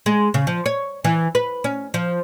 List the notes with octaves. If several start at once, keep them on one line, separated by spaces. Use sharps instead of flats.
G#3
C#3
F3
C#5
E3
B4
C#4
F3